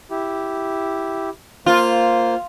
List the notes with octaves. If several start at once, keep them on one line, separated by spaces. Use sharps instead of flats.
E4 G4
A#3 F4 C5